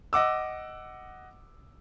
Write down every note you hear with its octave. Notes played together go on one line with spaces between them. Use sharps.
D#5 F#5 D6 E6